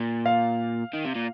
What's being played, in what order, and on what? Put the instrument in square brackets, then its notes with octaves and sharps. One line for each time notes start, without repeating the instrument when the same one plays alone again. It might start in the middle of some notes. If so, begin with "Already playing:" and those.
Already playing: [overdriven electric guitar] A#2
[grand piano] F5
[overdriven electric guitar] D#3
C3
A#2